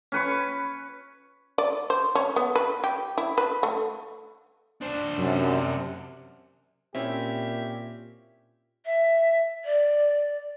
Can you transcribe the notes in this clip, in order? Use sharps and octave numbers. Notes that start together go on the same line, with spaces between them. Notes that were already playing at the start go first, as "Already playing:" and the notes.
C#4 B4 C#6
D5
C5
C#4
B3
B4
G4
E4
B4
A3
D4 C5
F#2 C3
A#2 C4 C#4 E4 G4 E5
E5
D5